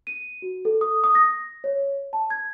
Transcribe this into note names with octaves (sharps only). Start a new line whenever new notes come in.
D#7
F#4
A4
D#6
D#6
A#6
C#5
A5
G#6